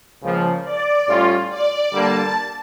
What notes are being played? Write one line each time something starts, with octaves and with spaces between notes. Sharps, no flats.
C#2 C#3 F3 A#3
D5
A2 G3 C#4 F4
D5
D3 G3 A#3 A5